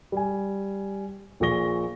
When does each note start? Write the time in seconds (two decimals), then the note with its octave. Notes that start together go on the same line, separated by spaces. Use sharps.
0.12 G3 G#5
1.40 A#1 A#2 G#4 C#6 A#6 G7